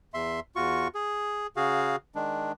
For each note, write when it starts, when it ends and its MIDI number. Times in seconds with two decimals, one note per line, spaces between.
0.14 0.40 40
0.14 0.40 76
0.14 0.40 84
0.56 0.88 40
0.56 0.88 65
0.56 0.88 66
0.56 0.88 85
0.95 1.47 68
1.57 1.96 49
1.57 1.96 66
1.57 1.96 68
1.57 1.96 77
2.15 2.52 51
2.15 2.52 56
2.15 2.52 62